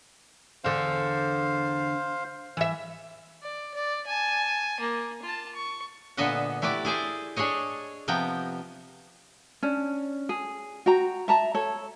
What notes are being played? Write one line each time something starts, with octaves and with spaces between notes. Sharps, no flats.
E2 D3 C5 F5
E3 E5
D5
D5
G#5 A5
A#3
F4 A5
C#6
A#2 D3 B3 D#5 E5 F#5
A3 E4 G4 B4 D5
E4 G#4 C5 D5
D4 G#4 A4 C#5 D#5
C3 F3 B3 G5 A#5
C#4 D4
G#4
F#4 G5 A#5
E5 A5 A#5
A4 C#5